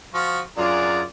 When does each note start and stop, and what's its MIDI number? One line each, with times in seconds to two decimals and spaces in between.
0.14 0.40 53
0.14 0.40 65
0.14 0.40 66
0.57 1.04 42
0.57 1.01 62
0.57 1.04 65
0.57 1.04 68
0.57 1.07 74
0.57 1.01 82